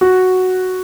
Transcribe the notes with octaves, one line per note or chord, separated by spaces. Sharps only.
F#4